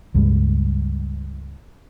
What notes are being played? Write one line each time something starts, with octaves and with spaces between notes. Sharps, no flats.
C#2 G2 G3 G#3